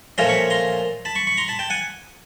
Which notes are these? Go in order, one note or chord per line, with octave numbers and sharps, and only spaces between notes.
A#2 F3 A3 C#4 A#5 C6
B5 C#6
A#5 C6
A5 B5
B5 C#6
B5 C#6
A#5 C6
A5 B5
G5 A5
F#5 G#5